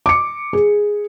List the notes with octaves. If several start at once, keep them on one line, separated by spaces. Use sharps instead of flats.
D6 C#7
G#4